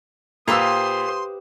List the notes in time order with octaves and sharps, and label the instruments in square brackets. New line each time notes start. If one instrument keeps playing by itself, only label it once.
[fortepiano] A#2 E6 [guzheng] G4 B4 F5 [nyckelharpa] C5 D#6 [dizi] C6